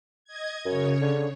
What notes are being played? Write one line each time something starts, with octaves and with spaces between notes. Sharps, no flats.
D#5 G#6
F#2 C#3 C#5
D3